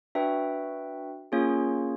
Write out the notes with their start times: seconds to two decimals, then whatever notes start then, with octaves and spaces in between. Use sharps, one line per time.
0.15 D4 F#4 B4 E5 G5
1.32 A#3 C#4 F4 G#4 C#5